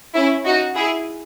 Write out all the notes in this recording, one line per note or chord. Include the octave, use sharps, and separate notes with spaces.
C#4 E4
D#4 F#4
E4 G#4